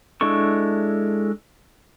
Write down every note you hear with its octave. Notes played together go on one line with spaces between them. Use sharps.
G#3 D4 E4 A4 C#6